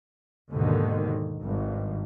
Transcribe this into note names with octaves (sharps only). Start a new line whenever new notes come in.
D#2 G#2 B2 D3 D#3
G#1 G2